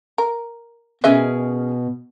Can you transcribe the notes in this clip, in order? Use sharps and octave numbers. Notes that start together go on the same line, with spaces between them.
A#4
B2 C#4 G#4 A#4 B4 D#5 E5